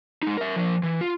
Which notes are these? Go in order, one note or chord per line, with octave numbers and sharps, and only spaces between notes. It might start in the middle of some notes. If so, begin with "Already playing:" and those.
G#3 D#4
A#4 E5
F3 A#4
E3
F4